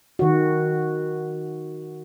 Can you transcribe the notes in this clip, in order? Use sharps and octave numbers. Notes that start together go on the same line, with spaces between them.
D#3 F#4